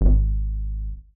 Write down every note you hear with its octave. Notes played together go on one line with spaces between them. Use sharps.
G#1